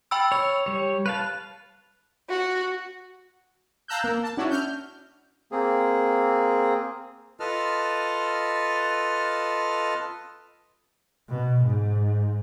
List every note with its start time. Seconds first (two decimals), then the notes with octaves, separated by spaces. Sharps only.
0.11 G5 B5 E6
0.32 C#5 F7
0.66 G3 C#5
1.06 B4 F5 A5 F#6
2.30 F#4
3.88 F5 A5 A#5 E6 F#6 G6
4.04 A#3
4.23 A5
4.37 C#4 D4 E4 F#4
4.50 F6 G6
5.52 A#3 C4 G#4
7.40 F4 A4 B4 D#5 A5 F6
11.29 B2
11.64 G#2